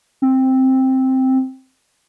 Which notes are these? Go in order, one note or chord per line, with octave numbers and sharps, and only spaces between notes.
C4